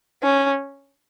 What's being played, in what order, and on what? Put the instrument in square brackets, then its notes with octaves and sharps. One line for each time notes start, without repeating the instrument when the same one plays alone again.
[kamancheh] C#4